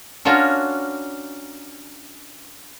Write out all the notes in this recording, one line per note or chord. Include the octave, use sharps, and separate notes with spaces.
C#4 D4 F4 F#4 A#4